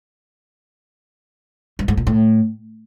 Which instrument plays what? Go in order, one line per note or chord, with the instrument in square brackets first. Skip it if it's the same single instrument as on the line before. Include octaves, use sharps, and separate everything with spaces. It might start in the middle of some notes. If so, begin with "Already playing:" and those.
[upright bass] G2
G#2
A#2
A2